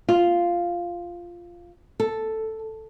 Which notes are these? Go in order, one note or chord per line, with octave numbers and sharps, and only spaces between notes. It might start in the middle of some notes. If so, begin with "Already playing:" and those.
F4
A4